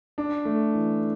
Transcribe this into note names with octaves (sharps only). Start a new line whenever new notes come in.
D4
A3
E3